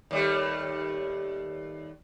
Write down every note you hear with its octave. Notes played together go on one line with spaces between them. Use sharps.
D#2 G3 A3